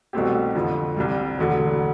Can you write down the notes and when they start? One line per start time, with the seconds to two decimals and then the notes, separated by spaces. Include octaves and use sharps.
0.13 C2 B2 A3 C4 G4
0.55 F2 D3 F3
0.96 C2 C3 G3
1.38 E1 D2 D3